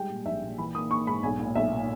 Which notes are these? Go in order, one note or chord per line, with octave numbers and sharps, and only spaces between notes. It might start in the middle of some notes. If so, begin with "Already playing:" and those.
Already playing: G3 G#3 G5
A#2
A#1 E5
A#2
E3 B5
A#3 D#6
A#3 C#6
G#2 B5
B1 G#5
A#2
B1 E5
A#2